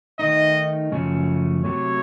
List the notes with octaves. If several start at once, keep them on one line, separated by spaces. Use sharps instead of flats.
D#3 A3 D#4 D#5
F#2 C#3 F3 A3 C#4
C3 F#3 A3 C#5